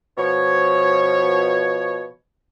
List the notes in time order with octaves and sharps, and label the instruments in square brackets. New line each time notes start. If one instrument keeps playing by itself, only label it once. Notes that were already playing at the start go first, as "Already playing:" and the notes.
[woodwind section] B2 F3 C#5